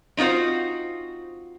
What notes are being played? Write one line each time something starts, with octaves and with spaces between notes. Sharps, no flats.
C4 D#4 F4 F#4 C5